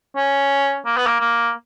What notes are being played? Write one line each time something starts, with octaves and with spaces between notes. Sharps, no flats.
C#4
A#3
B3
A#3
A#3